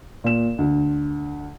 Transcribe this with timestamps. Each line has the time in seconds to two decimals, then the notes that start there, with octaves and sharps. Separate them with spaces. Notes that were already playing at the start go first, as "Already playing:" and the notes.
0.24 A#2 E7
0.58 D2